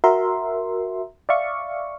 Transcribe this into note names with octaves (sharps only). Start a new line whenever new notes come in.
F#4 A#4 E5 C6
D5 E5 F5 C#6